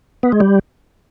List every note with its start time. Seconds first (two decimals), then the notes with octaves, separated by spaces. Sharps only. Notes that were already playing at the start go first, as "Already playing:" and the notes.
0.23 B3
0.32 G#3
0.40 G3